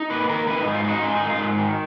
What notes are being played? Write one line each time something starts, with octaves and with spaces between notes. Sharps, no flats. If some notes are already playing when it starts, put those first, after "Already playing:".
Already playing: D#4
A#3 B4
D#3 A#4
D#3 B4
D#4
G#2
F4
D#4 F#4
G#3 F4
D#3 D#4
F4
G#2
D#3